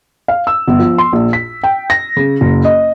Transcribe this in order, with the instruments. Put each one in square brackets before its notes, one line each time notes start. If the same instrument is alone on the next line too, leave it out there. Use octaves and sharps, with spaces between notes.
[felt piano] F5
E6
G1
F3
C6
A#1
B6
G5
A#6
C#3
F#1
D#5